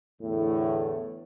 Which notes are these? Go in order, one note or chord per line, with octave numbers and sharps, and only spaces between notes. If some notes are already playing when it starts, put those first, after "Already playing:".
E2 A2 D3 A3